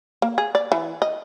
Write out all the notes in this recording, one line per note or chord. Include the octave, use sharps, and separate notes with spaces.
A#3
G#4
D5
E3
D#5